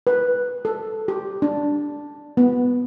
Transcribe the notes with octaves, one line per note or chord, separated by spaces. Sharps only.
B4
A4
G4
D4
B3